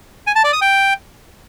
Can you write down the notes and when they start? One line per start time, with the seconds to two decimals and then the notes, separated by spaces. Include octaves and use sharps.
0.27 G#5
0.36 A5
0.44 D5
0.53 D#6
0.61 G5